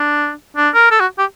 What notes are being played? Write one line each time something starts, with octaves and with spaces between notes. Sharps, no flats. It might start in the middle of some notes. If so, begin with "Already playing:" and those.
Already playing: D4
D4
A#4
A4
F#4
G4